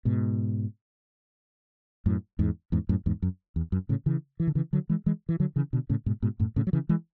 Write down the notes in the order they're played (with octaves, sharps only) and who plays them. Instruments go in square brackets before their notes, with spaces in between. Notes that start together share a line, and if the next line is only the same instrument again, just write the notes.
[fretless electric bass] G#2 B2
F#2 A2
E2 G#2
E2 G#2
F#2 A2
E2 G#2
F#2
E2
F#2
A2 C#3
C#3 E3
E3
D3
C#3 E3
D3 F#3
E3 G#3
E3 G#3
E3
D3 F#3
C#3 E3
B2 D3
A2 C#3
G#2 B2
G#2 B2
F#2 A2
A2 C#3
F#3
C#3 E3
E3 G#3